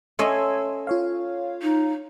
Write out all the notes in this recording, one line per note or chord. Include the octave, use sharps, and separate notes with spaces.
A3 C#4 D#5 C6 E6 G#6
F4 C#5 F5
D#4